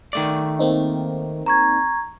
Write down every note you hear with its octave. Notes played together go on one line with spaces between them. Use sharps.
D#3 A3 D5
A#3 C4 D#4
A#5 C#6 G#6